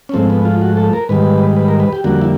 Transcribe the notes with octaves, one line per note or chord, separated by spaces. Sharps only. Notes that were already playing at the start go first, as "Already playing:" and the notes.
C#4
G#2 F3 A3 C4
B3
F4
F#4
A4
A#4
G#2 D#3 G3 B4
B4
A#4
B4
G4
F2 D3 G3 A#3 F#4
E4